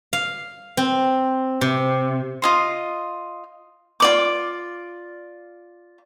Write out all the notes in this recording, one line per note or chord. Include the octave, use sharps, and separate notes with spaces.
F5
C4
C3
F4 D#5 C6
F4 D5 D6